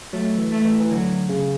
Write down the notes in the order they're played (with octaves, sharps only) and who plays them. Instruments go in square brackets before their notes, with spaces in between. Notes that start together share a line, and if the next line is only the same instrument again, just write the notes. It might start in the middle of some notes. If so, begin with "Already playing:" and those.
[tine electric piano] F#3 [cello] A3
[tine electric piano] E3
[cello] A3
[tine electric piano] E3
E3
[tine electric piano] D3 [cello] F#3
[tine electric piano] C#3